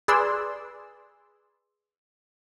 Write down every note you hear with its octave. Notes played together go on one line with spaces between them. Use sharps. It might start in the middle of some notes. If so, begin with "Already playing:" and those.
G#4 B4 D5 C6 E6